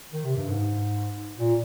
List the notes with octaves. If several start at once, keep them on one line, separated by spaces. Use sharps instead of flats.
D#3
C3
G2
G#2
A#2